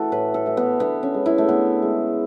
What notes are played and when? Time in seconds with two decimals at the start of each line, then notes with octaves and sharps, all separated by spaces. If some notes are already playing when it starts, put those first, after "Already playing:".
Already playing: E3 A3 F#4 A4
0.12 A2 B4
0.34 A4
0.46 E3 A3
0.57 B3
0.80 D3 B3
1.03 C#4
1.14 G#3
1.26 E4
1.38 A3
1.48 D3 B3
1.82 G#3